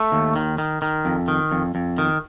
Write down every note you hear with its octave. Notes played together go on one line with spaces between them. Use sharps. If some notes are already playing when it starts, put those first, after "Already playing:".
Already playing: A3
D#2
D#3
D#3
D#3
F2
D#3
F2
F2
D#3